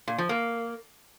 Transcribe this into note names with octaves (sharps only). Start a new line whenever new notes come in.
A#2
F3
A#3